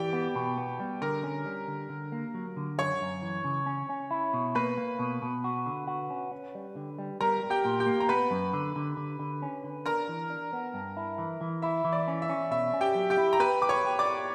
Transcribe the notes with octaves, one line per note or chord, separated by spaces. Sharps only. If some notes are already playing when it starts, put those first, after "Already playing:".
Already playing: E3 G4 D5 G5
B3
B2
B3
G3
D3 A#4 A#5
C#4
G3
D3
D3
A#3
F#3
D3
F#2 C#5 C#6
F#2
E3
C#3
C#4
C#4
E4
B2
A#3 B4 B5
A#3
B2
B2
F#4
D3
F#4
C#4
C#4
G3
D3
G3
G3 A#4 A#5
G3
G4 G5
A#2
G4 G5
A#3
A#5
B3 B4 B5
F#2
D3
D3
D3
D3
C#4
D3
D4 A#4 A#5
E3
D4
B3
G2
E4
E3
E3
E4 E5
E3
D5
C#4
E5
C#4
B2 E5
C#4
G4 G5
F#3
G4 G5
E4
A#5
G4 B4 B5
G4 D6
C#5 C#6
G4
D5 D6
G4